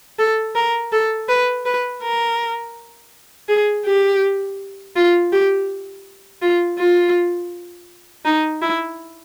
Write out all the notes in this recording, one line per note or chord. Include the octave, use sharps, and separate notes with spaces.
A4
A#4
A4
B4
B4
A#4
G#4
G4
F4
G4
F4
F4
D#4
E4